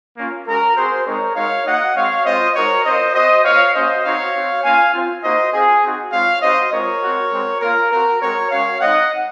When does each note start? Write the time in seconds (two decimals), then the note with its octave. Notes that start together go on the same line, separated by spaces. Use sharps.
0.17 A#3 C#4 F4
0.46 G#3 C#4 F#4 A#4
0.76 C4 F#4 G#4 C5
1.06 G#3 C4 D#4 A#4 C#5
1.36 G#3 D#4 F#4 C#5 F5
1.66 A#3 D#4 F#4 D#5 F#5
1.95 G#3 C4 F#4 C#5 F5
2.25 G#3 C4 F4 C5 D#5
2.55 G#3 D#4 F#4 A#4 C#5
2.85 C4 F4 C5 D#5
3.14 C4 F#4 C5 D#5
3.44 A#3 F4 C#5 F5
3.74 A#3 C#4 F#4 C5 D#5
4.04 C4 D#4 F#4 C#5 F5
4.34 C4 F#4
4.63 A#3 C#4 F4 F5 G#5
4.94 C4 F4
5.23 A#3 D#4 F#4 C5 D#5
5.53 C4 F4 G#4
5.83 C4 D#4 F#4
6.13 G#3 C4 F4 C#5 F5
6.42 C4 D#4 F#4 C5 D#5
6.72 G#3 C4 F4 A#4 C#5
7.02 C4 F#4
7.32 G#3 C4 F#4
7.62 A#3 F4 A#4
7.92 C4 F#4 A#4
8.21 G#3 C4 F#4 A#4 C#5
8.51 G#3 C#4 F#4 C#5 F5
8.81 G#3 C4 D#4 D#5 F#5